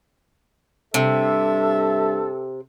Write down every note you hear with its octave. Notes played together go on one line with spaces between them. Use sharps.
G2 C3 A4 E5